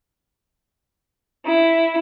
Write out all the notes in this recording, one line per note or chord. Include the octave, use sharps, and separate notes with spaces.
E4